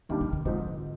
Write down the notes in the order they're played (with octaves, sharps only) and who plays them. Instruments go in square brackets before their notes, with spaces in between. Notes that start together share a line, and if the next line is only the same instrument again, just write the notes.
[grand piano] D#2 D#3 G3 A#3 D4 [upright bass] D3
[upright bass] D3
D3
[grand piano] G#2 F3 C4 D#4 [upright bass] D3